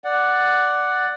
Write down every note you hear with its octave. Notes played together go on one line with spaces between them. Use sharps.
D5 F#5